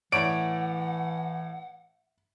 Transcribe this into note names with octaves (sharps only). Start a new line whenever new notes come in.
A2 E3 C#5 D5 F#5 D7